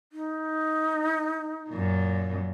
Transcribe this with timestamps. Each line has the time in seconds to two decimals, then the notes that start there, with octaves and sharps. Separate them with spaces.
0.13 D#4
1.70 F#2 A#2